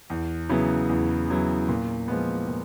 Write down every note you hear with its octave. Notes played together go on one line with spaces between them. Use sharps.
E2
C#3 F#3 B3 E4
E2
C#3 F#3 B3 E4
A#2
F3 G#3 B3
A#2